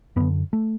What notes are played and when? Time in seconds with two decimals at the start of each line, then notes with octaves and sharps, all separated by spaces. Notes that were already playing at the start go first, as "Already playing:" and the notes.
0.16 F#2 D3 B3
0.53 A3